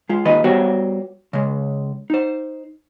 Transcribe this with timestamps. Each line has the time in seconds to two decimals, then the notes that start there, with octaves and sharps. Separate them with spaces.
0.09 G#3 F4
0.25 D#2 D#3 F4 B4 D#5
0.44 G3 B3 F#4 G4 C5 C#5
1.33 C#3 G#3
2.10 D#4 C5